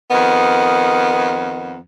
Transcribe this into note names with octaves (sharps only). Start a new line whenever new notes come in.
F2 D#3 B3